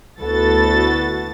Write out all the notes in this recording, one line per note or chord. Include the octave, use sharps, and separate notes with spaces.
D2 B3 E4 F#4 A4 A6